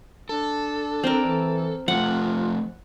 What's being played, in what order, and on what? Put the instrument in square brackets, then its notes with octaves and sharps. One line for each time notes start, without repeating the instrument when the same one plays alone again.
[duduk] D4 [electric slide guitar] A4
[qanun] C4 A#4
[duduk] E3
[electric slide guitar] F3 A3 [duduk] F4 [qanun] F#5